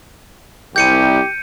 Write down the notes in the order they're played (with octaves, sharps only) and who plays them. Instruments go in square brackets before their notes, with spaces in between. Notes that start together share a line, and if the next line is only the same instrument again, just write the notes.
[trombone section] C2 [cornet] G4 [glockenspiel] G6 C#7 D#7